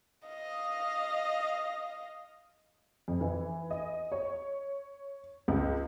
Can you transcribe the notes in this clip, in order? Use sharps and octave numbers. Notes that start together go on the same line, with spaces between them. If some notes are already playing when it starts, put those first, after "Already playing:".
D#5 F5
F2
E3
D#5
C#5
C#2